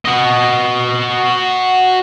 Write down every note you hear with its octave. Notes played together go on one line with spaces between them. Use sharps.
F#4 D#5